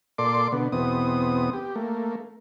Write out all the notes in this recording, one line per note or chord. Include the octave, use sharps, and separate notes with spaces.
A#2 A4 D5 C6 D6
B2 D3 B3
E2 B2 B3 C4 D#6
G4
A3 A#3